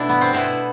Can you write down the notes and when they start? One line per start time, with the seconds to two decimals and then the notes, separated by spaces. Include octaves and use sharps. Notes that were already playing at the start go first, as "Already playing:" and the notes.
Already playing: B2 A3 D4 E4
0.09 B3
0.21 C4
0.33 B2 B3 E4